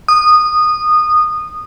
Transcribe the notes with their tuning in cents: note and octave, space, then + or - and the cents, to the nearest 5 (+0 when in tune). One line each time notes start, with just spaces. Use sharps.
D#6 -20